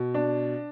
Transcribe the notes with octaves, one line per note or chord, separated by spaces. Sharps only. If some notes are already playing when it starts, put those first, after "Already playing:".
Already playing: B2
D4